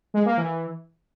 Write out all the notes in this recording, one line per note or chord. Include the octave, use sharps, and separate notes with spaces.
G#3
A#3
E3